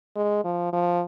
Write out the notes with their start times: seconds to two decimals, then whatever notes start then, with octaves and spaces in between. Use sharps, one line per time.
0.16 G#3
0.44 F3
0.73 F3